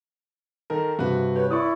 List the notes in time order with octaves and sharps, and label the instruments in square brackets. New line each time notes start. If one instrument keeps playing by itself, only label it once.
[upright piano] D#3 A4 A#4
[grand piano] G2 C3 [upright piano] F#4 B4
[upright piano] G4 C#5 [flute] B4
[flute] E4 [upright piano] B4 D5 [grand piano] C#6 D#6